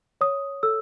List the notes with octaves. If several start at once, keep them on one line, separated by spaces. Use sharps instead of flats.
C#5 D#6
A4 E6